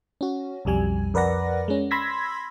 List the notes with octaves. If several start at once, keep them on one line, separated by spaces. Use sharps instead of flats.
C#4 F#4
B1 F2 G3 G#5
F2 A#4 B4 D5 F#5 A#6
G#3 C#4
B5 C6 E6 G#6 A#6 B6